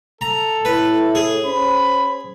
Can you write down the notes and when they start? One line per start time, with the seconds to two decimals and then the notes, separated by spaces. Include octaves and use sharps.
0.21 A4 A#5
0.65 A2 B4
1.15 G#4
1.46 C#4 C5 B5